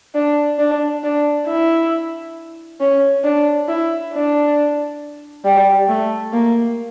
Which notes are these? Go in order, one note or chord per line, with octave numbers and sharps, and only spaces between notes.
D4
D4
D4
E4
C#4
D4
E4
D4
G3
A3
A#3